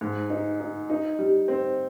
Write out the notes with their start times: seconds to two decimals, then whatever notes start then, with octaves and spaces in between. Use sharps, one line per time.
0.01 G#2
0.30 D#4
0.60 D#4
0.90 D#4
1.19 G3
1.48 C4